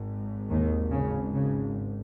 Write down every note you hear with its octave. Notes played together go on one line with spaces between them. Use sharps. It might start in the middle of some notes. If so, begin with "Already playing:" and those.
Already playing: G#1 G#2
D#2 D#3
C#3
C#3